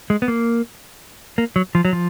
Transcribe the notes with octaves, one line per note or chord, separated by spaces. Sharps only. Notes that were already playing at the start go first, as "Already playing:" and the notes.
G#3
B3
A#3
A#3
F#3
F3
F#3
F3